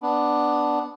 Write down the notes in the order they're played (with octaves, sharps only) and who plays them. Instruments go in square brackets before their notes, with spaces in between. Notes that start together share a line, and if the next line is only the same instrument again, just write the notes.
[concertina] B3 D4